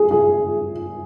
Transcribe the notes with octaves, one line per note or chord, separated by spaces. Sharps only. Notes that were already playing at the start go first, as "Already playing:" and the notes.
Already playing: G#4
G#4